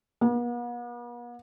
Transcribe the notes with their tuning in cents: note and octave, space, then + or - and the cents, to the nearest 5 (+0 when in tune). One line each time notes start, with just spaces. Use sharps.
B3 -45